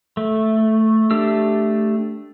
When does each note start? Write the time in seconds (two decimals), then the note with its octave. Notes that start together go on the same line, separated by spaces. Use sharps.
0.17 A3
1.11 A3 D4 G4 E6